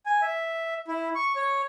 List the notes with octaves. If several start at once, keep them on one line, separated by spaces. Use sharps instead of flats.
G#5
E5
E4
C#6
C#5